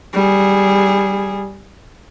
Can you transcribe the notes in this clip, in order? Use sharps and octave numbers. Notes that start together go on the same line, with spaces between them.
G3 G#4